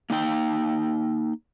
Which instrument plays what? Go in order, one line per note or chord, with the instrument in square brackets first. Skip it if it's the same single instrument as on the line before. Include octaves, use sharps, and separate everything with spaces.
[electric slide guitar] A#3 D#4 G5